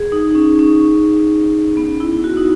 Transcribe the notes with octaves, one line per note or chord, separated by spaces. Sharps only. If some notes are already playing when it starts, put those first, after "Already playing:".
Already playing: G#4
D#4
C#4
C#4
B3
E4
F#4
D#4